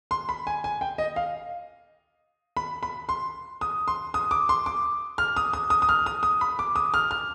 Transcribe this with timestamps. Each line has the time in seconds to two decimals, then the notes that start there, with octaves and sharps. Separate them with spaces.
0.11 C6
0.29 B5
0.47 G#5
0.64 G#5
0.81 G5
0.98 D#5
1.16 F5
2.57 B5
2.83 B5
3.09 C6
3.61 D#6
3.88 C6
4.14 D#6
4.31 D6
4.49 C6
4.66 D6
5.18 F6
5.37 D#6
5.53 D#6
5.70 D#6
5.82 D#6
5.89 F6
6.06 D#6
6.23 D#6
6.41 B5
6.59 D6
6.76 D#6
6.94 F6
7.11 F6